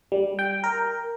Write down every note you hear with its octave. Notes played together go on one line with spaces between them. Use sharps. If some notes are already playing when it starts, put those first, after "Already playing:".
G3
G5
A#4